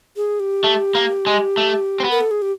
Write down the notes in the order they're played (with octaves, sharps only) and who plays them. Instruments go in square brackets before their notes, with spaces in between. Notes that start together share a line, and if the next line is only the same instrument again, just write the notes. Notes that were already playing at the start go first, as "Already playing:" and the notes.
[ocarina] G#4
G4
[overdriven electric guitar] A3
A#3
G#3
A3
C4
B3
[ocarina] A#4
A4
G#4
G4